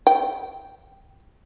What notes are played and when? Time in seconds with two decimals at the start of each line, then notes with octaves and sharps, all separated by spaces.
0.07 G5